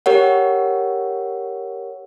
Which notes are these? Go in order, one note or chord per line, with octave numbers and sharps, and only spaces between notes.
G4 A#4 C#5 F#5